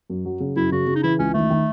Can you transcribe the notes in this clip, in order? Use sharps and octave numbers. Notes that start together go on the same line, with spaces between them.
F#2
F#3
C#3
F#2 E4
C#3 F#4
C#3
D#4
E3 E4
C#2 C#4
D#3 A3
D#3